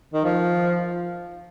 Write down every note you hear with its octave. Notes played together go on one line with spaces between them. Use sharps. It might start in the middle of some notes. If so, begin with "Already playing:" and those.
D#3
F3